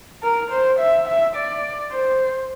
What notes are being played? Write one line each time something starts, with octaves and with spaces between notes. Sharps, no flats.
A#4
C5
E5
E5
D5
C5